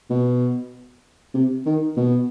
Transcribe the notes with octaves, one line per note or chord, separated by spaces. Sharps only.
B2
C3
D#3
B2